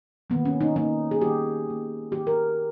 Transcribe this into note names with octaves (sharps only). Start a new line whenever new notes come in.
D#3 A#3 B3
C#4
D#4
D#3 A#3 D#4
G#4
D#3 A#3 G4
D#3 A#3
D#3 A#3 G4
A#4